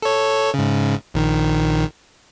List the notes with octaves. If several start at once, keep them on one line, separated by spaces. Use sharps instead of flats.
A4 C#5
G#2 C#3
A#1 D#3